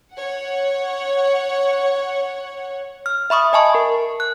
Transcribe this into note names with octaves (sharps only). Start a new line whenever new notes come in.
C#5 F#5
F6
E5 B5 C#6 D#6
D#5 G#5 A5 C#6
A#4
F#6